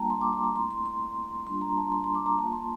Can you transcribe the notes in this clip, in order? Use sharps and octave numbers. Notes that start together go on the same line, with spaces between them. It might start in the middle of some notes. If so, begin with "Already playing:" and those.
Already playing: G3 A#3 D4 F4 G5 A5 A#5
C6
D6
C6
A#5
A3 C4 E4 C6
C6
C6
G3 A#3 D4 F4 C6
A#5
A5
C6
C6
D6
A#5
A#3 F4 A5
C6